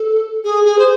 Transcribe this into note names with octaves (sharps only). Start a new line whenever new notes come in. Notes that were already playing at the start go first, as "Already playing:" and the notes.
Already playing: A4
G#4
G#4
C5